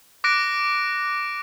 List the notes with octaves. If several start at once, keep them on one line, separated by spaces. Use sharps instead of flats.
D6 F#6 A#6 D7